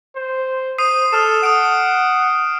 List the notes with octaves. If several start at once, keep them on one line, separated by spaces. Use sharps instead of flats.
C5
C5 D#6 C7 D#7
A4 D#6 F6 E7
F#5 D#6 D7